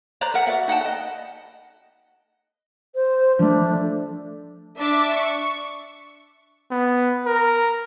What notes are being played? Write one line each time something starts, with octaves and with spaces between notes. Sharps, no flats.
B4 C5 D5 A#5
A#4 E5 F#5
F#4 D5 E5 F#5
D#4 F#5 G5 A5
B4 D#5
C5
F3 A3 D4
D4 E5 D6
C#6
B3
A#4